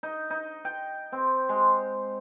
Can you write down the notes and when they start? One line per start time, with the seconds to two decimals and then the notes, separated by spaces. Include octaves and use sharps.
0.03 D#4
0.30 D#4
0.65 G5
1.12 C4
1.49 G#3